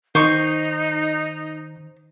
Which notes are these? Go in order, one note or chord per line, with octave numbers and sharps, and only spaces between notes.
D#3 D#4 C5 C#6